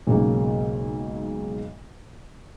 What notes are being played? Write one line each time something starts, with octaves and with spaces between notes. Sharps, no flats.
B1 G#2 C#3 A#3